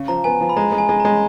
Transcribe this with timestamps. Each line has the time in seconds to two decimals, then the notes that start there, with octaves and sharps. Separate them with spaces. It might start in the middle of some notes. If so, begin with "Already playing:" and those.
Already playing: C#3
0.08 F3 A#5
0.24 B3 G#5
0.41 F3
0.49 B5
0.57 G#3 A#5
0.72 G#3
0.78 G#5
0.89 G#3
1.00 G#3 A#5